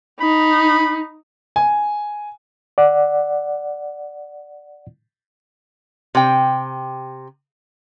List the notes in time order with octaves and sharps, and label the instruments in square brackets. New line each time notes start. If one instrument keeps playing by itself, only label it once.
[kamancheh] D#4 [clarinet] B5
[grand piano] G#5
[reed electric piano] D5 F#5
[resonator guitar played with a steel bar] C3 G5